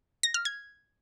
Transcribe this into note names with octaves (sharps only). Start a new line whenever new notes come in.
A#6
F6
G#6